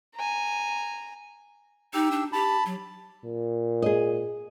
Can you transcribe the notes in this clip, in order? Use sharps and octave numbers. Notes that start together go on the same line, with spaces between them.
G#5 A#5
D#4 G4 E6
D4
G4 A5 B5
F#3
A#2
G#4 D#5